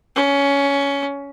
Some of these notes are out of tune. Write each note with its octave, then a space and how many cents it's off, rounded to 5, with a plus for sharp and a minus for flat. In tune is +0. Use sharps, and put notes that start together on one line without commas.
C#4 +15